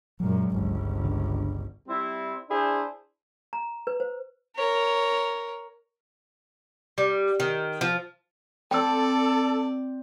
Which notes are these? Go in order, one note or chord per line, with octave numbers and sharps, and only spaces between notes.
F#2 A#2 F#3 G#3
G1 C#2
D3
G3 C4 E4
D4 E4 G#4 C5
A#5
B4
C5
A#4 C#5
G3
D#3
F3
C4 A4 D5 G5 E6